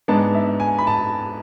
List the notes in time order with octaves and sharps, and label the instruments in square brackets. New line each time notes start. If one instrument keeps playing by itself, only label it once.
[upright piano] G#2 G#3 B3 D4 A5
E5
G#5
B5
A5